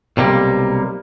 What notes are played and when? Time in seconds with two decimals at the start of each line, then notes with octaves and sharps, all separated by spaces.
0.17 B1 C3 G3 A#3